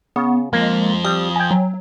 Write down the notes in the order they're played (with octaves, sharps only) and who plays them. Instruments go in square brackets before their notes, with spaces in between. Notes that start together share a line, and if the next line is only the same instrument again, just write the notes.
[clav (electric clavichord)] C#3 [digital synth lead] B3
[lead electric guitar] F2 F3 [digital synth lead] G#3 [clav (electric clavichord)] A#3
[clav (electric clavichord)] G3 [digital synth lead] D#6
[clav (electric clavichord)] G5 G#5
[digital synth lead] F#3